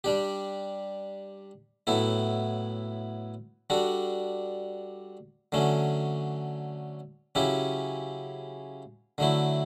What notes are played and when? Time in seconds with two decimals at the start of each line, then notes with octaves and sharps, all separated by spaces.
0.04 G3 D4 G4
1.87 A2 F#3 B3 E4 A4
3.70 G3 D4 F#4 A4
5.52 D3 F#3 A3 C#4
7.35 C#3 F#3 C#4 E4 G4
9.18 D3 F#3 A3 E4